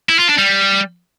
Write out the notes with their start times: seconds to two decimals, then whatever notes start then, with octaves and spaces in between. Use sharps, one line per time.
0.09 E4
0.19 F4
0.28 D4
0.38 G3